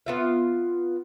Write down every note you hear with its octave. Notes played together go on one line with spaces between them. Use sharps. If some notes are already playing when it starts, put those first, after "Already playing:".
B3 F4 E5